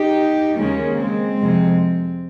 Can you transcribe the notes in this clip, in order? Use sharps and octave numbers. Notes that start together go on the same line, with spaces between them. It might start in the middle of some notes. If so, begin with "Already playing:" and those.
Already playing: D#4 G4
D#2 C#3 G#3 A#3 C#4
G#3 C4
F2 C3 F3 G#3